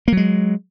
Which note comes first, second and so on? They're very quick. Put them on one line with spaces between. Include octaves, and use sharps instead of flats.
A#3 F#3 G#3